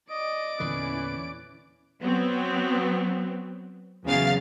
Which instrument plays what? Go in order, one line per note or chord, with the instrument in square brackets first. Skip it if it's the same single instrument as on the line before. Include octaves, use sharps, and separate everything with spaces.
[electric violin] D5 D7 [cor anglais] D#5
[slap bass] E2 A#2 D3 [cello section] C#4 E4 [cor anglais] B4
[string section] F#3 B3 C4
E2 C#3 F#3 F5 A6